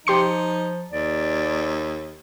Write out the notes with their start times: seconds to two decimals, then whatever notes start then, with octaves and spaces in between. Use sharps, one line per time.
0.07 F3 D#4 G4 C6 C#7
0.92 D#2 D5